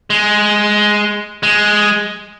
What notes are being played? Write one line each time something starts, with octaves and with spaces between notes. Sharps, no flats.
G#3
G#3